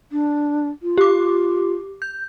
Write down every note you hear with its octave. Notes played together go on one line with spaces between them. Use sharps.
D4
F4
G4 D6
G6